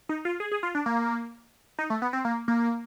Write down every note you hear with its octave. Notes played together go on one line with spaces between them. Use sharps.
D#4
F4
G#4
G#4
F4
D4
A#3
D#4
A3
B3
C4
A#3
A#3